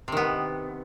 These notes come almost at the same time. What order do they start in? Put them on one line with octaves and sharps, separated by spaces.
C3 D#3 B3